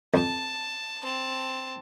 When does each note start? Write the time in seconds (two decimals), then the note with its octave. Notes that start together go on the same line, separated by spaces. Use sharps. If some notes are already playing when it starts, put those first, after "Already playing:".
0.14 F2 A5
1.02 C4 A5